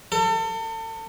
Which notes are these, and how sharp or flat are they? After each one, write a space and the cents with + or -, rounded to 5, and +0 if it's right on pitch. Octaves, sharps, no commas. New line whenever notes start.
A4 +35